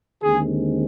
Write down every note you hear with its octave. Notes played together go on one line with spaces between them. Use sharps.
D#2 D3 G#3 C4 G#4